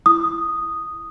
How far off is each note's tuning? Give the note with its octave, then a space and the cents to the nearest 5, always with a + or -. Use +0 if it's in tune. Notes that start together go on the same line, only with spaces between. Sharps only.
E4 +15 D#6 -5